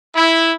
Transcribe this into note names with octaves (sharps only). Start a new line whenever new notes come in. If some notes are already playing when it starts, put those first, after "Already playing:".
E4